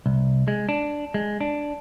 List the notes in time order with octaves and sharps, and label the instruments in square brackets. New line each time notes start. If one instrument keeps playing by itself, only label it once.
[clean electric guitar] C2
G#3
D4
G#3
D4